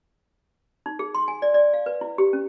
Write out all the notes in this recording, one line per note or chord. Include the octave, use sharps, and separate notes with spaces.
D#4
G#4
C6
G#5
D5
D5
F5
B4
E4
G4
C#4